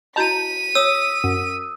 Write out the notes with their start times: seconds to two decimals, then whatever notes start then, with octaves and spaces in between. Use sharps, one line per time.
0.16 E4 F#4 D#5 A5 A#5 G6 B6 D#7
0.75 C#5 D#6 E6
1.24 F#2